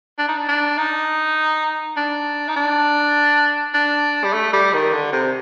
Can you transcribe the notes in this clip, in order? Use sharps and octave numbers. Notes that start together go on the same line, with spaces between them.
D4
D#4
D4
D4
D#4
D4
D#4
D4
D4
G3
A3
G3
D#3
D3
C3